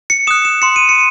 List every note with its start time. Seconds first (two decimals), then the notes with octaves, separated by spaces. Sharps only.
0.10 C#7
0.27 D#6 F#6 E7
0.45 E7
0.62 C6 C#7
0.76 D#7
0.89 C#7